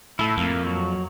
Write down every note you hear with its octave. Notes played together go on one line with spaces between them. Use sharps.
A2 E4 A4
F2 A#3
F#3